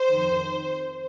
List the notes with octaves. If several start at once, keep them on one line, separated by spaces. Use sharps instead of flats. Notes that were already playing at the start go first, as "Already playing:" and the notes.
Already playing: C5
F2 D#3